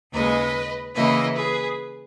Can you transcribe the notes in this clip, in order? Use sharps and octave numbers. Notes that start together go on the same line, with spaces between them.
D#2 C#3 G#3 B4 D#5
C#3 E3 A#3 E4 B4 D#5
G#4 B4